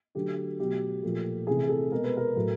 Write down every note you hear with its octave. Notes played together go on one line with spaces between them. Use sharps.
D3 F#3 A3 G4
B2 F#3 A3 G4
A#2 F3 A3
C3 E3 A3 G#4
A4
B2 G#3 A#4
B4
A#4
A2 F#3 A3